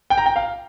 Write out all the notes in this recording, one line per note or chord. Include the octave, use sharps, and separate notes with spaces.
G5
A#5
G5
F5